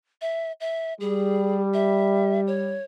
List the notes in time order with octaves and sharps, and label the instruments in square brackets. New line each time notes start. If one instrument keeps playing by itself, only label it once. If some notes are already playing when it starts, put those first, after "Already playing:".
[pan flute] E5
E5
[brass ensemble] G3 [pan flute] G#4
[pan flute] E5
C#5